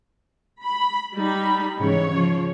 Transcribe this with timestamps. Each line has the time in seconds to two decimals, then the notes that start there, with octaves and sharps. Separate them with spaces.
0.63 B5
1.14 G3 D#4 B5
1.79 G#2 C#3 E3 C#5
2.11 C#3 F3